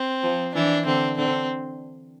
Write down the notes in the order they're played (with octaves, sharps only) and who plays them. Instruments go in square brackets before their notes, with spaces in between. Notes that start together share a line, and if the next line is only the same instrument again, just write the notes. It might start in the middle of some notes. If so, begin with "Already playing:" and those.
Already playing: [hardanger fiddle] C4
[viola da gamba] F3
[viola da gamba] E3 [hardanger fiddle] D4
[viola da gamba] D3 [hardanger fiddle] C4
[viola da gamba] D3 [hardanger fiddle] C4